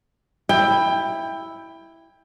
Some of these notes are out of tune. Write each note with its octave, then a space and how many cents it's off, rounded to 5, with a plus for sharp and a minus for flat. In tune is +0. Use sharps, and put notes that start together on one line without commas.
E4 +0 G5 +20